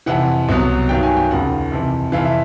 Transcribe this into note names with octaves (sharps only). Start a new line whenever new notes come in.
F2 C3 E3 F#5
C2 B2 F#3
G2 D#3 F#3 G5
G#5
G5
D#2 C#3 F3 F#5
F2 C3 E3
F2 C3 E3 F5
E5